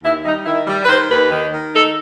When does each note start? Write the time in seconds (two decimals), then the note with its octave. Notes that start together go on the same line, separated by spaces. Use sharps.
0.03 D#2 E4
0.25 G3 D#4
0.46 D#3 E4
0.67 G3
0.84 B4
0.89 D#3 C5
1.09 D#2 B4
1.31 D#3
1.52 D#3
1.74 D#4 A4